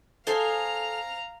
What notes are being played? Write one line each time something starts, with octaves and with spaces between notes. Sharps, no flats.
A4 C5 D#5 F5 G#5 A#5 C6